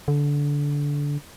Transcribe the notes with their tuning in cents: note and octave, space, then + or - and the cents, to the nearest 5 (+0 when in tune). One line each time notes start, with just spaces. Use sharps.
D3 -20